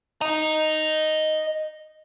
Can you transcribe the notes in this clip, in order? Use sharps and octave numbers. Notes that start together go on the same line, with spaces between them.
D#5 A#5